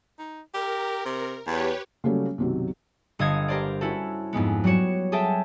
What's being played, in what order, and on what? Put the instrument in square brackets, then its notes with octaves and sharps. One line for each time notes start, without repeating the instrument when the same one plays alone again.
[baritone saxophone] D#4
[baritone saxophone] G4 [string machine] A#4
[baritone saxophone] C3
[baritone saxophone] E2 [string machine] G4 B4 C#5
[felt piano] C#3 F#3 G3 A3 A#3 C#4
B1 F#2 C3 D#3 F#3
[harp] G1 A4 D#5 F5 D#6 G#6
G4 A#4 C5 D5
C#4 E4 F#4 A4
F2 G#2 G#3 B3
F#3 G3 F#4 C#5 E7
G#4 A4 E5 G5 A5